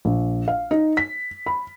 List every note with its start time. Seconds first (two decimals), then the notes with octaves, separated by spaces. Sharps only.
0.05 A#1
0.48 F5
0.71 D#4
0.97 B6
1.46 B5